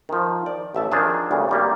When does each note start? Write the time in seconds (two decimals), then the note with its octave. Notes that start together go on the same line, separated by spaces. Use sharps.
0.09 D#3 F3
0.46 D5
0.75 A1 E5 A5
0.92 D#3 F3 D4 G#4 A5
1.31 D2 G2 C#3
1.49 D#3 G3 A#3